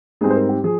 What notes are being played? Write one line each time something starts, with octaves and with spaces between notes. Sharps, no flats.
G#2 G3 C4 G#4
C5
A#4
G4
F3 G#4